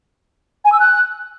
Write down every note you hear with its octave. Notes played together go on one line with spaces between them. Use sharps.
G#5
E6
F#6